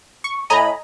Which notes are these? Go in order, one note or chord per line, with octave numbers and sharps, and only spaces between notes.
C#6
A2 D#5 G#5 A#5 B5